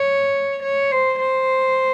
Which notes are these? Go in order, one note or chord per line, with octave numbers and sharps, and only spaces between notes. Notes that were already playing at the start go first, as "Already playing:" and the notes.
Already playing: C#5
C#5
C5
C5